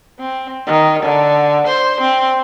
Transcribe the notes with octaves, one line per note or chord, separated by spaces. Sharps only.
C4
D#3
D3
C5
C4